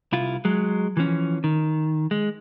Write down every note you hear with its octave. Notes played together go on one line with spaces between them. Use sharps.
C2 E4 F4
F#3 G#3
E3 F3 C#4
D#3
G#3